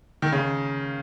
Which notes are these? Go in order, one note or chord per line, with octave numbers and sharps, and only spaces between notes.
D#3
C#3